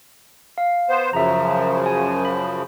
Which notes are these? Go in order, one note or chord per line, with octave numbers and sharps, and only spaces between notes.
F5
B3 C5
F#2 C#3 F3 E5 A#5
G#5
B5